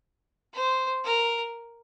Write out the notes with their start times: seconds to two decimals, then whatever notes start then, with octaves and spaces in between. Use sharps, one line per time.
0.54 C5
1.04 A#4